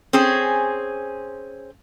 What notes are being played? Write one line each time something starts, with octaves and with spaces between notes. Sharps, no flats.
C4 C#4 G#4